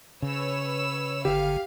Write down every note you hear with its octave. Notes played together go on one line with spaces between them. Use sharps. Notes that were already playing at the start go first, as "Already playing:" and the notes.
C#3 B4 C#5 E6
G#1 D3 G4 F5